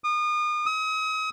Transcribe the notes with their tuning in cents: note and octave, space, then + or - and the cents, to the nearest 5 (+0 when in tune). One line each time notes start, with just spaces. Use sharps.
D#6 -35
D#6 +40